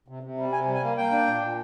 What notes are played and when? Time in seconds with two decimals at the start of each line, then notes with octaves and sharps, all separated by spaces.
0.08 C3
0.23 C3
0.38 G3
0.53 C3 G#5
0.68 G3
0.75 G#5
0.83 A#3
0.97 A#3 G5
1.12 D4
1.27 A#2
1.42 A#2